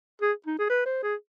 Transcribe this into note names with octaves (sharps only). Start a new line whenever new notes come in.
G#4
D#4
G#4
B4
C5
G#4